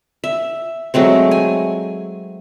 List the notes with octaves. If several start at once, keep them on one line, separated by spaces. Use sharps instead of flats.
E5
F#3 G#3 A3 C4
G#5